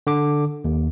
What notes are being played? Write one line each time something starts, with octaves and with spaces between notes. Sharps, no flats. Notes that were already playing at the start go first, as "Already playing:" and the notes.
D3 D6
D#2